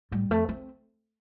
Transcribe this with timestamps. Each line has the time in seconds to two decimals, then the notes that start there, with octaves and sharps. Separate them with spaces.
0.12 A2 G3
0.30 F2 A3
0.49 C4